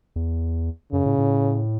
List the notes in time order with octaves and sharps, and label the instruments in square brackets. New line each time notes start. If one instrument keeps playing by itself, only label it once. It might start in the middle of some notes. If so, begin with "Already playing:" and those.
[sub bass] E2
[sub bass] F#2 [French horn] C#3
[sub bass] A2
A2